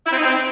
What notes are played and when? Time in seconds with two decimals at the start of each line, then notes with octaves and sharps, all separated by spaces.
0.06 E4
0.11 C4
0.17 D#4
0.22 C4